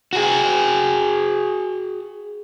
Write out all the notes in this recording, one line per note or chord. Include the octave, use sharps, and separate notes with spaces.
F#4 G#4